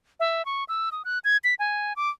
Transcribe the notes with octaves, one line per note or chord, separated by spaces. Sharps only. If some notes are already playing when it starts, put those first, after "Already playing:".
E5
C#6
E6
D#6
F#6
G#6
B6
G#5
D6